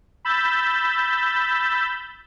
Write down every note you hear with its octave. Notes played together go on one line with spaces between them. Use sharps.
B5 E6 G6 A6